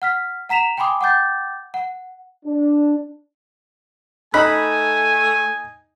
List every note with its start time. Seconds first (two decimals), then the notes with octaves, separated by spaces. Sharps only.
0.02 F#5 F6 B6
0.49 F#5 A#5 B6 E7 F7
0.77 G5 G#5 B5 C6 D6 D#6
1.01 F#5 G5 D6 G6 A6
1.74 F#5
2.45 D4
4.34 A3 D#4 G#5 B5 F#6